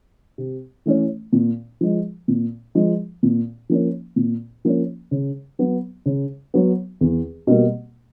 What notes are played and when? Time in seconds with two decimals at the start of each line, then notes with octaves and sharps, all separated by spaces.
0.38 C3
0.86 E3 A3 C#4
1.33 A#2
1.81 F3 G#3
2.28 A#2
2.75 F3 G#3
3.23 A#2
3.69 F3 A#3 C#4
4.16 A#2
4.65 F3 A#3 C#4
5.11 C#3
5.59 F#3 B3
6.06 C#3
6.54 F#3 B3
7.01 E2
7.47 B2 G3 A#3